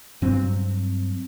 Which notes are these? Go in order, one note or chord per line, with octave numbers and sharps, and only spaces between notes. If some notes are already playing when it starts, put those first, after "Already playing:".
G2 F#3 C4